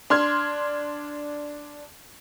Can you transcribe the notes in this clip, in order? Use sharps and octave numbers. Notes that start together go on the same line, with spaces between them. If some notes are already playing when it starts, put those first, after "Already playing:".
D4 C6 F6 G#6